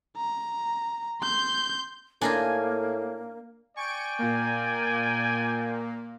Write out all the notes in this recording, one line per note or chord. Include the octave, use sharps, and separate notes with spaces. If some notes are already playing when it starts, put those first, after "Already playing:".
A#5
C6 G6
A2 A#3 D4 D#4 F4 G#5
D5 G5 G#5 C#6 D7
A#2 A#3